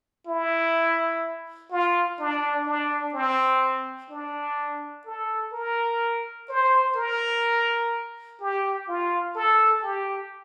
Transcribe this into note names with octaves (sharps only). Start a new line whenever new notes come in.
E4
F4
D4
D4
C4
D4
A4
A#4
C5
A#4
G4
F4
A4
G4